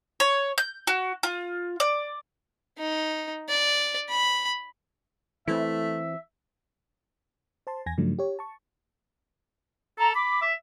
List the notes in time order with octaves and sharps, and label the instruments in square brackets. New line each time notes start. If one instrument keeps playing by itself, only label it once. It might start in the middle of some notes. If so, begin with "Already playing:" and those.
[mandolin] C#5
G6
F#4
F4
D5
[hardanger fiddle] D#4
D5
B5
[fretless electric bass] E3 C4 [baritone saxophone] A3 [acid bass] E4 [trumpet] E5
[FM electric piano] C5 A5 C6
E2 G#5 G#6 A#6
G2 C#3 F3 F#3 A3 D4
G4 C#5
A5 C#6
[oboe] A4 [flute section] A#5
[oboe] B5 [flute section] D6
[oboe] E5